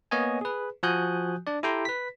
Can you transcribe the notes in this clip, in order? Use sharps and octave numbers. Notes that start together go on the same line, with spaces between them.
A#3 B3 C#5 D#5 G#5
G#4 B4
F3 F#4 G#5 D#6 F#6 G6
D4 D5
E4 G4 A4 G5 A#5 C6
B4 B6